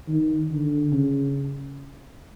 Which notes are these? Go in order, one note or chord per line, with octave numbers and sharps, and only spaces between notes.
D#3
D3
C#3